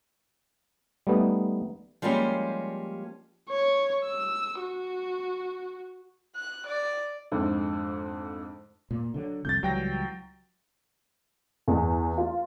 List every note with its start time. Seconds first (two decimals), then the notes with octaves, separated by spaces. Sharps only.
1.07 G3 A3 B3 D#4
2.02 F3 G3 G#3 A#3 C#4 G4
3.49 C#5
4.05 E6
4.61 F#4
6.36 F#6
6.67 D5
7.32 F2 G#2 D3
8.91 A#2
9.14 D3 E3 F#3
9.45 C2 F2 G6 A6
9.63 C#2 E3 F#3 G3 G5 A#6
11.68 E2
12.18 F4